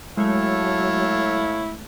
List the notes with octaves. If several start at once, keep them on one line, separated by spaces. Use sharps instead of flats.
F#3 G#3 A3 E4 A4 C#5 F5